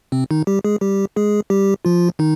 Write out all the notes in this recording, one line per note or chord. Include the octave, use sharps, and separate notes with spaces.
C3 C4
D#3 D#4
G3 G4
G#3 G#4
G3 G4
G#3 G#4
G3 G4
F3 F4
D#3 D#4